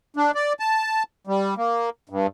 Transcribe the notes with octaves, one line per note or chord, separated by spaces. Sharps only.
D4
D5
A5
G3
A#3
G2